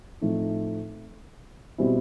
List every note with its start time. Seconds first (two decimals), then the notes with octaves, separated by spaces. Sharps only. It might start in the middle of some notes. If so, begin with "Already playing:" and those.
0.21 A2 F3 A3 C4 D#4
1.78 B2 G3 C4 E4